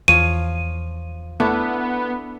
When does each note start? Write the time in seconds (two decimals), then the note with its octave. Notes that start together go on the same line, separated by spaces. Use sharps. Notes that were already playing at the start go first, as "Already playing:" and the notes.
0.08 E2 F3 C#5 F5 D#7
1.40 A3 B3 D4 E4